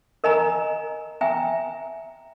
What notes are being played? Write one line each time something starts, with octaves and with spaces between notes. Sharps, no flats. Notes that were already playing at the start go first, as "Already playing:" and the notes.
A#4 D#5 G#5 A#5
E5 G5 G#5 A#5